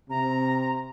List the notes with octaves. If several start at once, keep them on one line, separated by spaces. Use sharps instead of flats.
C3 A#5